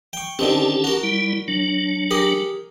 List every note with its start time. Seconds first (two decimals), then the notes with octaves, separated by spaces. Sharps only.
0.13 G5 C#6
0.39 D3 D#3 C4 C#4 G4 A5
0.84 F#4 A#4
1.03 G3 E4
1.48 F#3 D4
2.11 G4 G#4 A#4